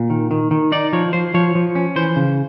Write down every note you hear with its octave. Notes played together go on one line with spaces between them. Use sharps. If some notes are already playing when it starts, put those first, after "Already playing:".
Already playing: A#2
D#3
D#3
D#3
D#4 D5
F3 C#5
F3 C5
F3 C#5
F3
C#4
E3 C5
C#3